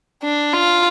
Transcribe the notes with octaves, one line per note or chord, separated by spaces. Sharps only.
D4
F4